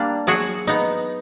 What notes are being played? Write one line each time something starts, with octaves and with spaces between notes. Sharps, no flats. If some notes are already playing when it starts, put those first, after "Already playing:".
Already playing: G3 A#3 D4
F#3 F#4 G#4
B3 D#4